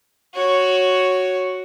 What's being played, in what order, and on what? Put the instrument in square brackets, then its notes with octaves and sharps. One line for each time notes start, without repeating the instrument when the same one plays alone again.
[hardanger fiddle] F#4 C#5